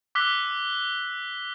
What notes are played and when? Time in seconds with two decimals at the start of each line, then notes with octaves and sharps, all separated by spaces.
0.15 D6 E6 F#6 B6 G7